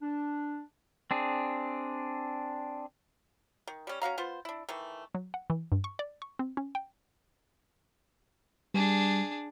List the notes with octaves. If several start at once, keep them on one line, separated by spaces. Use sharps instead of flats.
D4
C4 D4 G#4
D#3
G3 C#4
C#4 F#4 F5 A#5
B3 F4 C5
D4 E4
D#3 E3 A3
F#3
F#5
E3
G2
C#6
D5
C#6
C4
C#4
G5
G3 D4 G#4